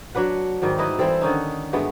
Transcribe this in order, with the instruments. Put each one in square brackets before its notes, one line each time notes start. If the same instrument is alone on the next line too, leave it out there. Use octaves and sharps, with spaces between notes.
[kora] F#3 D4 B4 F#5
G#2 D#3 F#3 G3
D#4 E4 B4 D#5
E3 G3 C4 A4
D3 D#3 C#4 D#4
G2 G#3 A3 B3